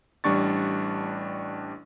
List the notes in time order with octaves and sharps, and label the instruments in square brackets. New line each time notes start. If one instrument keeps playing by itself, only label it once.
[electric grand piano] A1 G3 D4 C#6 A6